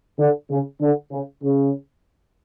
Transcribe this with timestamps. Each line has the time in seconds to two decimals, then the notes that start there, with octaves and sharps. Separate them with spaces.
0.18 D3
0.50 C#3
0.81 D3
1.10 C#3
1.42 C#3